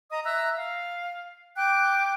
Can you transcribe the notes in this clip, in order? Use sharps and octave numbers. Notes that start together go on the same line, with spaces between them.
D#5 A#5 D#6
E5 A#5 E6 F#6
F5
G5 D6 F#6